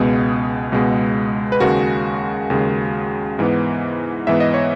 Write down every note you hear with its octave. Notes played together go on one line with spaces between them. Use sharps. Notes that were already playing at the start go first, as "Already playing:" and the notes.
Already playing: C#2 B2 G#3 B3 G#4
C#2 B2 G#3 B3
B4
D#2 C#3 G#3 F#4 A#4
D#2 C#3 G#3
G#2 E3 B3
G#2 E3 B3 E5
D#5
C#5